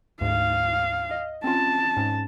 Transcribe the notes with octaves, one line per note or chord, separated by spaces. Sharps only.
D2 G#2 F5
D#5
C4 C#4 F4 A5
G#2 C#4